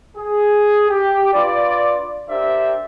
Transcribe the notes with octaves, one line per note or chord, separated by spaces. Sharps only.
G#4
G4
D4 F4 B4 D5
D4 G4 A#4 C5 D5 E5